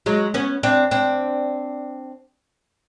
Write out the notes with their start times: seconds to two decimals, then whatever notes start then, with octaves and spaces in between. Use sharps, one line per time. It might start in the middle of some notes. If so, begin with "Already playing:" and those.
0.06 F#3 G#3
0.34 B3 C#4
0.63 C4 D4
0.91 C4 D4